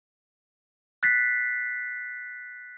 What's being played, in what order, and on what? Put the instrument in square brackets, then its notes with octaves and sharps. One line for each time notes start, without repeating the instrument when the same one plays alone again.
[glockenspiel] F#6 A6 B6 C7